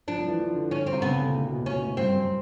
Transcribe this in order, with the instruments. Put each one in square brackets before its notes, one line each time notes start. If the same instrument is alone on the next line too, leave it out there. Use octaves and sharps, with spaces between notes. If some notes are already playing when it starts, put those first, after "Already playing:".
[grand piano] F3 [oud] D4
[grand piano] F3
E3
F3
D3
[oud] C#4
C4
[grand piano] C3
[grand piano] C#3 [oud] B3
[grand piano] D3
A#2
A2
B2
A#2
[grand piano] B2 [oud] C#4
[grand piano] A2
[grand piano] G2 [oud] C4
[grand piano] F#2